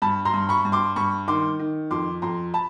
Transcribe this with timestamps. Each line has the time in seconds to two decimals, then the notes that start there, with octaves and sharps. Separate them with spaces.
0.02 G2 A5 B5
0.25 A#5 C6
0.33 G2
0.49 B5 C#6
0.65 G2
0.72 C6 D6
0.96 G2 B5 C#6
1.28 D#3 C6 D6
1.59 D#3
1.91 F2 C6 D6
2.22 F2 A#5 C6
2.54 A5 B5